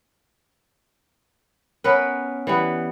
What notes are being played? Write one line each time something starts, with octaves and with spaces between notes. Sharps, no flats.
B3 C#4 A#4 B4
E3 G3 B3